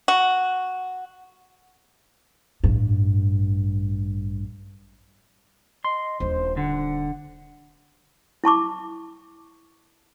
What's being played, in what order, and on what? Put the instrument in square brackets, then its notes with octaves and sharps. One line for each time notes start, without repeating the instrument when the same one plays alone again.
[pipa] F#4
[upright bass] A1 G2
[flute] D#5 [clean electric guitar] C6
[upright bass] D#1 D4 [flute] C5
[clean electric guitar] D3 [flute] F#5
[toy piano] E4 A5 C#6 D6